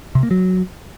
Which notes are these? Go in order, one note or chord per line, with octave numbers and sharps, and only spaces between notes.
C3
A#3
F#3